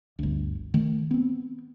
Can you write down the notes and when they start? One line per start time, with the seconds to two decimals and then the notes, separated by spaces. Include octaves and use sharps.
0.19 G1 D2
0.74 D#3 A3
1.11 B3 C4